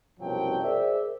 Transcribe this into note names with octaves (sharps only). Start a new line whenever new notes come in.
C2 F#2 B2 F3 F#3 G5
G#4 A#4 C5 D5 E5